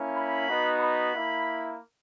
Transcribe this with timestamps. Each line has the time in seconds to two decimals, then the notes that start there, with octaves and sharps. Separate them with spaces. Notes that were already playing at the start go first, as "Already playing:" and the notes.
Already playing: A#3 C#4 E4
0.16 B5
0.49 B3 D#4 F#4
0.81 B5
1.14 A#3 E4